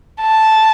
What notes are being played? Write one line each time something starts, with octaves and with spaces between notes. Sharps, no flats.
A5